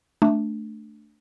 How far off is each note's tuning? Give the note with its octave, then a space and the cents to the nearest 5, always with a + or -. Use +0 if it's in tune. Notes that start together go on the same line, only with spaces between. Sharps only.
A3 +0 D4 +0